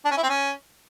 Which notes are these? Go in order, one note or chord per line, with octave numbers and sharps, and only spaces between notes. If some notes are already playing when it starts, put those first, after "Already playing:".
D4
C#4
E4
C4
C#4